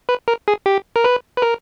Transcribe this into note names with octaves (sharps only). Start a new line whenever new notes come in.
B4
A#4
G#4
G4
A#4
B4
B4
A#4